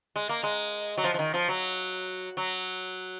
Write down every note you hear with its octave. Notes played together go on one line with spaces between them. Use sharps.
G#3
A#3
G#3
F#3
F3
F3
D#3
F3
F#3
F#3